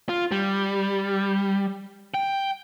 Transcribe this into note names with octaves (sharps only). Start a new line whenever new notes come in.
F4
G3
G5